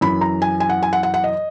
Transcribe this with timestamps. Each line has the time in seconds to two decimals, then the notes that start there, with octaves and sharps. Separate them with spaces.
0.01 F#2 E3 B5
0.21 A#5
0.42 G#5
0.60 G#5
0.69 F#5
0.83 G#5
0.93 F#5
1.03 F#5
1.14 F#5
1.24 D#5